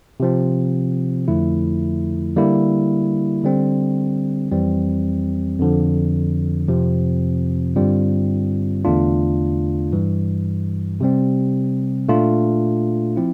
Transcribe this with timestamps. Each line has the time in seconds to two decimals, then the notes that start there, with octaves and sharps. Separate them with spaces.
0.20 C3 F3 C4
1.28 F2 D3 F3 A3 E4
2.36 D3 G3 A#3 E4
3.44 D3 G3 C4
4.52 F2 E3 G3 C4
5.60 F2 D3 F3
6.68 F2 C3 F3 C4
7.76 G2 D3 G3 C4 F4
8.85 E2 D3 A3 D4 F4
9.92 G2 E3 G3
11.00 C3 G3 C4
12.09 A#2 A3 D4 F4
13.16 F3 C4 E4